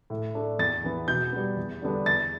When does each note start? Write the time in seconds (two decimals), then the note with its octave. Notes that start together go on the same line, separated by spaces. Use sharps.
0.10 A2
0.35 A3 D4
0.59 E2 A6
0.84 E3 B3
1.08 B2 G6
1.33 G3 B3
1.57 E2
1.82 D3 G3 B3 D4
2.06 E2 A6